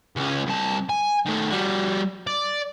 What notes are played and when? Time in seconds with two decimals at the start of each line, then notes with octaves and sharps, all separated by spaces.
0.16 C#2 C#4
0.46 C2 A5
0.89 G#5
1.26 D#3 A3
1.51 G3 F#4
2.27 D5